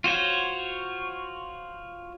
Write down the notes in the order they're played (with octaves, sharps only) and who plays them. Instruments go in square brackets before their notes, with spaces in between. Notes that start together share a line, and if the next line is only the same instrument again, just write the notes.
[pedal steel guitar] F4 F#4 C5 C#5